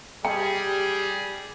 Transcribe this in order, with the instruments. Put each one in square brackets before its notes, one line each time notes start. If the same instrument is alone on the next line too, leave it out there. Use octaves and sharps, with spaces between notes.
[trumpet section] G3 G#4 [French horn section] G4 [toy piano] G5